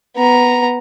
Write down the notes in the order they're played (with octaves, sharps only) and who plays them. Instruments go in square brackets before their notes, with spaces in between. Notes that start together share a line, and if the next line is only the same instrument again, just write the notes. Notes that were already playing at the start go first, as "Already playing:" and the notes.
[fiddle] B3 A#5